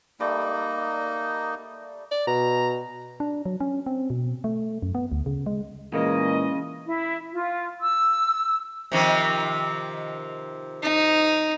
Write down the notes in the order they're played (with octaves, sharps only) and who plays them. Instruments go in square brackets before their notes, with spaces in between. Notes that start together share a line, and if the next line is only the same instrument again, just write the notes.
[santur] G3 A3 D5 [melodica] A#3 D#4 D#5
[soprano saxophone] D5
[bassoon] B2 [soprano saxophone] A#5
[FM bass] D4
F#3
C#4
C4
B2
A3
F#2
B3
D2
C#3
G#3
[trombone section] A#2 E3 G#3 [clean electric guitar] C#3 [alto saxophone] A#3 [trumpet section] D#5
[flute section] E4
F4
E6
[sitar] C3 D#3 F3
[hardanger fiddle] D#4